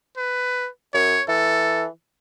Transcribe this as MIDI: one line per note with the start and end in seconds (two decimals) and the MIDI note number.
0.17 0.70 71
0.94 1.18 42
0.94 1.23 73
1.28 1.88 52
1.28 1.86 69